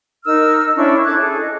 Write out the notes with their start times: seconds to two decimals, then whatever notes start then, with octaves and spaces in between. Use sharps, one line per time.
0.25 D#4 A#4 E6 F6
0.76 C#4 D4 E4 C#6
1.05 A4 D6 F#6 G#6
1.18 G#4 A4
1.40 D#5